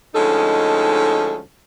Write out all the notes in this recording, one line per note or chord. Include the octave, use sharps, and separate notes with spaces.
D2 F3 G#3 C#4 D#4 A4